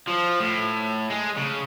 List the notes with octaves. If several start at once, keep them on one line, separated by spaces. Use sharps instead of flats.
F3
A2
G#3
C#3